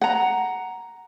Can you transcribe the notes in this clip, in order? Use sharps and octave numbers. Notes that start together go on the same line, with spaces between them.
F#5 A#5